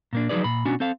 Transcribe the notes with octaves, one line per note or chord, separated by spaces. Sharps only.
A#2 A#3 D4
F3 F#3 D#4 G#4 B4 D5
A#2 B5
B2 C#4 D4 F#4 G#5
C4 A4 F5